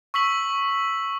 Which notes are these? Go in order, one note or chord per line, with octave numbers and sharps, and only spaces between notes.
C#6 E6 B6 F#7